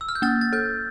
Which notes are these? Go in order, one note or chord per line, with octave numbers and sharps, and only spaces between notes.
E6
F6
G6
A#3 F6 A6
A6
A4 G6